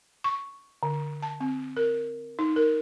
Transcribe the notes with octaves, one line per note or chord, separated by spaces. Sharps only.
C#6
D3
A5
C4
A#4
D#4
A#4